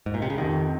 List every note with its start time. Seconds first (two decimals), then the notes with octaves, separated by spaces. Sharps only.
0.06 G#2
0.14 A#2
0.22 C3
0.30 C#3
0.38 F1 F2 C3 D#3